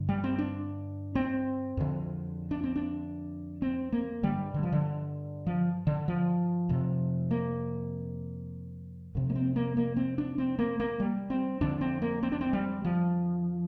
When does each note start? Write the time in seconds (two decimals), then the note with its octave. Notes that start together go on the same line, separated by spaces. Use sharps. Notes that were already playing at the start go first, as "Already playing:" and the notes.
Already playing: G2 D3
0.09 G3
0.24 C4
0.39 D4
1.15 C4
1.77 F2 D3
2.51 D4
2.64 C4
2.76 D4
3.62 C4
3.92 A#3
4.23 G2 D3 G3
4.54 D3
4.63 F3
4.72 D3
5.46 F3
5.87 D3
6.08 F3
6.69 F2 C3
7.31 A#3
9.15 F2 C3
9.30 A#3
9.35 C4
9.56 A#3
9.77 A#3
9.96 C4
10.18 D4
10.38 C4
10.59 A#3
10.80 A#3
11.00 G3
11.30 C4
11.61 F2 D3 D4
11.81 C4
12.02 A#3
12.23 C4
12.32 D4
12.41 C4
12.53 G3
12.84 F3